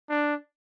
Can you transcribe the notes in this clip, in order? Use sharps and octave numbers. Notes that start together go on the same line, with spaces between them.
D4